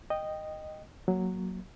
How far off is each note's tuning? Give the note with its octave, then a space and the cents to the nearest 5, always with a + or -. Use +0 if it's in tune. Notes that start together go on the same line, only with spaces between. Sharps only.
D#5 -10 G5 +0
F#3 +0 A#3 +0